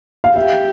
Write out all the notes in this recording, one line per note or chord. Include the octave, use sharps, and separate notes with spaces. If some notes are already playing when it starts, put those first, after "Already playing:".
F5
G4 E5